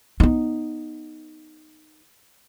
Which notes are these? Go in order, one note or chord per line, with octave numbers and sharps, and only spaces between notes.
B3 D#4